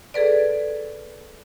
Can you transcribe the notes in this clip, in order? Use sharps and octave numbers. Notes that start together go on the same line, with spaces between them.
G#4 A4 B4 D5